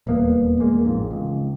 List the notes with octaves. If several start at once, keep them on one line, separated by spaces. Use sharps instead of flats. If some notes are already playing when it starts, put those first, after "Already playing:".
D#1 E2 A#3 B3
E2 G#3 A#3
A1 F2 G#2
C#2